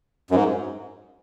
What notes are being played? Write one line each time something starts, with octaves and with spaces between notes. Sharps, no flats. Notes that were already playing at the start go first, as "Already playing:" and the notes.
F#2
G#2